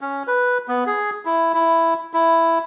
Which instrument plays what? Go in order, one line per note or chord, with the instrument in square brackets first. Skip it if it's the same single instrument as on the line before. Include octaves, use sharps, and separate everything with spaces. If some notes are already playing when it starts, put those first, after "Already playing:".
[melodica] C#4
B4
B3
G#4
E4
E4
E4